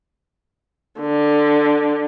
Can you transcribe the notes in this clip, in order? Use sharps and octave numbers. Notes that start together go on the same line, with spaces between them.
D3